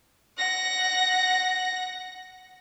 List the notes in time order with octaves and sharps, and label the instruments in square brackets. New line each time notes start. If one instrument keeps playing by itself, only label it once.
[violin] F#5 A#6